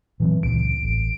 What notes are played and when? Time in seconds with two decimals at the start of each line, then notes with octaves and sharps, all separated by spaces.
0.20 A#2 E3 F#3 C4
0.43 C#2 A#2 D7
0.83 A1